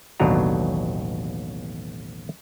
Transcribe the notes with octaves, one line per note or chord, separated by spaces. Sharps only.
A1 D#2 B2 F#3 D4 A#5